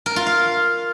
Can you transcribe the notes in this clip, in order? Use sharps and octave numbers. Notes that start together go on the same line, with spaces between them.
A#4
F4
F5